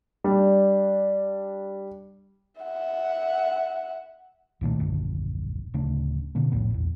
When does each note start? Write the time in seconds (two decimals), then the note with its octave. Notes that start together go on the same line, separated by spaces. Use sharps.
0.24 G3 D4
2.61 E5 F#5
4.61 C2 A#2 D#3 A3
4.80 D#1 A#1 F#2 D3
5.74 D1 C#3 A3 D4
6.35 B2 D3 A#3
6.52 C2 F2 A2 B3
6.70 A#1 E2